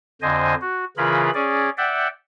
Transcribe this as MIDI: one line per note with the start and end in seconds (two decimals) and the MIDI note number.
0.22 0.54 41
0.22 0.54 50
0.22 0.54 72
0.22 0.54 75
0.22 0.54 80
0.61 0.85 66
0.97 1.30 49
0.97 1.30 52
0.97 1.30 65
0.97 1.30 68
0.97 1.30 70
0.97 1.30 83
1.34 1.70 61
1.34 1.70 68
1.34 1.70 74
1.77 2.08 74
1.77 2.08 76
1.77 2.08 78
1.77 2.08 79